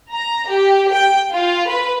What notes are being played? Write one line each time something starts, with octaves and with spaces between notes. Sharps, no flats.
A#5
G4
G5
F4
B4